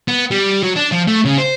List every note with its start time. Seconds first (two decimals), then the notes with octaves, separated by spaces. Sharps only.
0.08 B3
0.31 G3
0.62 F#3
0.76 D4
0.92 F3
1.08 A3
1.25 C#3
1.38 C5